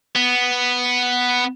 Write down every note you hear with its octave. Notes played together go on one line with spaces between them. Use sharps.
B3